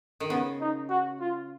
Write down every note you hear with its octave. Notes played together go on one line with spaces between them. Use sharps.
D#3
C#3 B3
D#4
F#4
F4